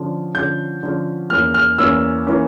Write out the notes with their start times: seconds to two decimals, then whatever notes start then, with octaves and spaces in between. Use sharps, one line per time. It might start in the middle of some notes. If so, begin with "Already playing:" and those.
Already playing: D3 F3 C#4
0.35 D3 F3 C#4 G6
0.83 D3 F3 C#4
1.30 E2 E3 A#3 C#4 F6
1.54 F6
1.78 E2 E3 A#3 C#4 E6
2.27 E3 A#3 C#4